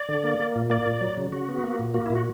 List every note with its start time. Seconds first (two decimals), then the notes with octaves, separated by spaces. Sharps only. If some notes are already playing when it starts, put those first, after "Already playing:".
Already playing: D5
0.09 D3
0.24 A#3
0.40 A#3
0.56 A#2
0.70 A#3 D5
0.86 A#2
1.01 F#3
1.17 C#3
1.32 C#3 F#4
1.49 B3
1.64 A#3
1.79 A#2
1.94 A#3 F#4
2.06 E4
2.10 A#2
2.15 F#4